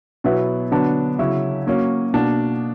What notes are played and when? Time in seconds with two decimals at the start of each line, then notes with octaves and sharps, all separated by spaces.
0.24 B2 F#3 B3 E4
0.72 D3 F#3 B3 D4
1.19 C#3 F#3 C#4 E4
1.67 F#3 A#3 C#4
2.14 B2 A#3 D4